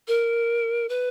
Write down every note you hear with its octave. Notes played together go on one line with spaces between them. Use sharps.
A#4
B4